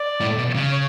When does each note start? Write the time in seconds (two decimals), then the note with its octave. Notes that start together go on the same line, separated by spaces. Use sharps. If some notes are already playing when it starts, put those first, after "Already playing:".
Already playing: D5
0.20 A2
0.37 B2
0.55 C#3
0.72 C#5